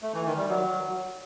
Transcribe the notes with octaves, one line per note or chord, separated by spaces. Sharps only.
A3
E3
D#3
G3
F#3